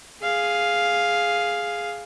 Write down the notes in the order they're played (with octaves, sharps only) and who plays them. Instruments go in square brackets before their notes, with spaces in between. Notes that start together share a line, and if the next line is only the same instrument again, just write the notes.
[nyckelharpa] G#4 F5